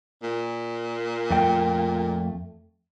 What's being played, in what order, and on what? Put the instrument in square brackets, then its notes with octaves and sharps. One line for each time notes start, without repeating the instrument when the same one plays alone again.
[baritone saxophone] A#2
[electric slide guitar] F2 A3 G5